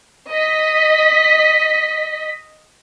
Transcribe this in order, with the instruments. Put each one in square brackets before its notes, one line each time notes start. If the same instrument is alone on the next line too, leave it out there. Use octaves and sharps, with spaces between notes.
[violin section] D#5 B6